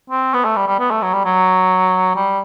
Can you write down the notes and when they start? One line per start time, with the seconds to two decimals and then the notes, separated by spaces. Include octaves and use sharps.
0.10 C4
0.34 B3
0.45 A3
0.56 G3
0.67 G3
0.79 B3
0.91 A3
1.02 F#3
1.14 G3
1.25 F#3
2.16 G3